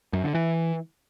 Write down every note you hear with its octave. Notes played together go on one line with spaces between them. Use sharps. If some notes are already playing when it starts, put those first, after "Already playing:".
F#2
D3
E3